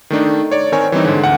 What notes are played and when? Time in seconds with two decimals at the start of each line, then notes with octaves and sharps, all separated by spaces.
0.10 D#3 A3 D4 D#4
0.51 C#5 D5
0.72 D#3 C4 A#4 C#5 G#5
0.92 E3 G3 C4 D#4
1.04 G#2 D3
1.23 D2 F#5 C#7